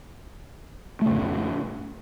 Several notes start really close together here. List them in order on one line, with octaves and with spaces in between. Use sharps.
A3 C#3 F2 A2